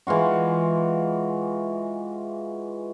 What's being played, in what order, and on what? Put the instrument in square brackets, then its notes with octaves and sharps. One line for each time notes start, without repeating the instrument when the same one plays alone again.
[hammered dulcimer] E3 G#3 F4 F#4